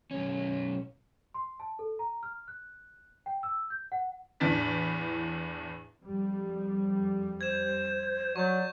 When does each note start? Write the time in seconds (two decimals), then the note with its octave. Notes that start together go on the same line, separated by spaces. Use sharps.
0.11 B1 C#4
1.34 C6
1.60 A5
1.79 A4
1.99 A#5
2.23 F6
2.48 F#6
3.26 G5
3.43 E6
3.70 G6
3.92 F#5
4.40 E2 A2 B3 D4 B4 B6
6.02 F2 G3
7.41 C5 G#6 E7
8.36 F#3 D5 C#6 G6